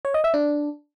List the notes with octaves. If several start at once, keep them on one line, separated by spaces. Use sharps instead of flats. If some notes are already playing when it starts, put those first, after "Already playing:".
C#5
D#5
E5
D4